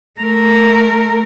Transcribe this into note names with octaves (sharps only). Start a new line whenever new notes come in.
A3 A#4